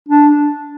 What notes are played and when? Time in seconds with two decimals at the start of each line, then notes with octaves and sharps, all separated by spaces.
0.08 D4